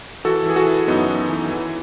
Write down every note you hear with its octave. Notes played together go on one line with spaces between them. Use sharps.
E3 F#4 A4
E3 G#4
F#4 A4
E3
F#2 B3 D#4
E3
E3
E3